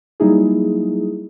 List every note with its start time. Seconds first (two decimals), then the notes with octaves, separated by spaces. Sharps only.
0.20 F#3 G3 A#3 D#4 E4 G#4